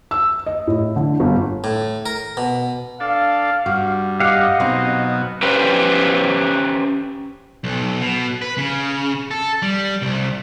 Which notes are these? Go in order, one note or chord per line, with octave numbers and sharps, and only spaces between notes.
E6
D#5
A2
D3
G1
A2
A#4
B2
D4 A4 F5
G2 F#4
G4 D#5 F5 F#5
B2 F#3 C4 D#4
C#4 G4 B4 C5
B1
B2
B4
C#3
A4
G3
C2